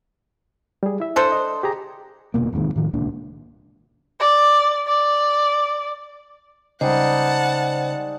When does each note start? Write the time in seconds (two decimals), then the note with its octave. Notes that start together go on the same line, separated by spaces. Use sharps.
0.83 G3 G#4
1.00 E4 E5
1.16 D4 A4 C5
1.32 D#5
1.63 G4 G#4 A#5
2.34 F1 D2 B2 A#3
2.52 E1 F2 G#2 D#3
2.76 A2 D#3 F3
2.93 D1 C#2 A#2 D4
4.20 D5
4.87 D5
6.81 C#3 G3 G#3 D#4 C5 D#5 F#5 A5